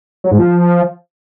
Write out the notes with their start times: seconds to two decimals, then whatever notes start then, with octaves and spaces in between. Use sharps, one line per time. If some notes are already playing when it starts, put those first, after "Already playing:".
0.24 F#3
0.31 G#2
0.38 F3